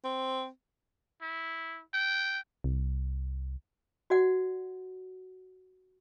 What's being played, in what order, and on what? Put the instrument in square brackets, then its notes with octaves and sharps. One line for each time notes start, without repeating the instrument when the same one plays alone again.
[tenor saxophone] C4
[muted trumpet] E4
G5
[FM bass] C2
[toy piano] F#4 D5 F#5